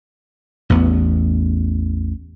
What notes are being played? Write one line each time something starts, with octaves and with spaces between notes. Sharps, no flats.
A1 E2 B3